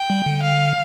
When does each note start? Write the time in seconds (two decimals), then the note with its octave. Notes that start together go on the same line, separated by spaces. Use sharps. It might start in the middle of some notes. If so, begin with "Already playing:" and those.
Already playing: G5
0.10 G3
0.26 D3
0.43 F5